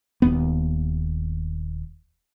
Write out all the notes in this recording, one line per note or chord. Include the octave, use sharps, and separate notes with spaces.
D#1 D#2 B3